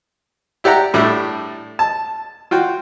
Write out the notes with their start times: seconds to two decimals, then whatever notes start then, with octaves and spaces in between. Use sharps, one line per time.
0.64 E4 G4 D5 F#5 A#5
0.94 A2 G3 A3 D4 E4
1.79 A5
2.51 F4 F#4 G5